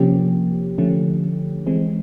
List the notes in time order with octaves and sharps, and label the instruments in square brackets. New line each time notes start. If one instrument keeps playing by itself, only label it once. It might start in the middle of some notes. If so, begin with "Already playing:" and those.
Already playing: [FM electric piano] C3 F3 A#3 C#4 G4
D3 F3 A3 C#4
E3 G#3 C4